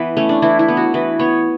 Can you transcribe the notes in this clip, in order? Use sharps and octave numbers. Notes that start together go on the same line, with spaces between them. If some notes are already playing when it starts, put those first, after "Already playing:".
Already playing: E3 B3 B4
A3 C#4
D4
E3 E4
E4
B3
F#4
E3 B4
B3 C#5